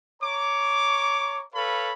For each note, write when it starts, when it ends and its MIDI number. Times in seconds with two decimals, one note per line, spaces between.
0.23 1.44 73
0.23 1.44 82
0.23 1.44 85
0.23 1.44 86
1.55 1.92 69
1.55 1.92 71
1.55 1.92 73
1.55 1.92 77
1.55 1.92 83